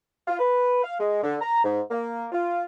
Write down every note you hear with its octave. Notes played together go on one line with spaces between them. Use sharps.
F4
B4
F5
G#3
D3
A#5
G#2
A#3
F4